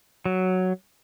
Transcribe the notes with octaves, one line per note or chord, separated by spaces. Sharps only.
F#3